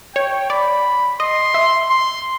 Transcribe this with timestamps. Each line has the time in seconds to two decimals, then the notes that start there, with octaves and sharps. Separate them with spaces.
0.15 C#5 G5
0.50 D5 B5
1.20 D#5 C6
1.54 E5
1.89 C6